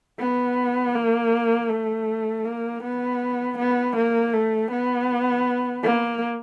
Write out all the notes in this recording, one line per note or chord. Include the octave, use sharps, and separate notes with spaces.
B3
A#3
A3
A#3
B3
B3
A#3
A3
B3
A#3